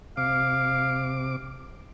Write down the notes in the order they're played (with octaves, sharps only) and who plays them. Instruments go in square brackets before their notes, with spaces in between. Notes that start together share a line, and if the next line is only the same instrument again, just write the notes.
[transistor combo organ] C3 D6 [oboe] F5